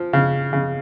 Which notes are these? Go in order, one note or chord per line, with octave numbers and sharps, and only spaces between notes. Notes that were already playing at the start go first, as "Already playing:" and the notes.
Already playing: F3
C#3
C#3